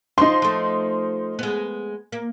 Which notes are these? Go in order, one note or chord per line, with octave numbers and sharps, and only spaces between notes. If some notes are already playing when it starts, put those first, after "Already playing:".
F3 D#4 C6
F3 A3
G#3 B3
A#3